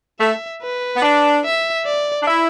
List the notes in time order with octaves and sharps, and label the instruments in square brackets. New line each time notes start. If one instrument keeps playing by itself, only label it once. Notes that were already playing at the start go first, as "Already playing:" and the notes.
[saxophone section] A3 [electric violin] E5
[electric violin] B4
[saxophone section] B3
D4
[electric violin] E5
D5
[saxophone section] D4
E4